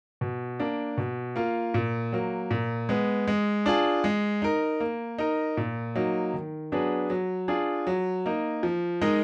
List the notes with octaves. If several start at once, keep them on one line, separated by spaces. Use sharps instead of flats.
B2
A#3 D4
B2
A#3 F4
A#2
F#3 A#3
A#2
G#3 B3
G#3
D4 F4 G#4
G#3
D#4 A#4
A#3
D#4 A#4
A#2
F#3 A#3 D#4
D#3
F#3 B3 D4 G#4
F#3
D4 F4 G#4
F#3
A#3 D#4
F3
G#3 D#4 A#4